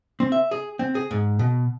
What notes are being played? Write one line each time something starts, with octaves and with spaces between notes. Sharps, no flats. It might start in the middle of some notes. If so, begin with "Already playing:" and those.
C4
E5
G#4
C4
G#4
G#2
B2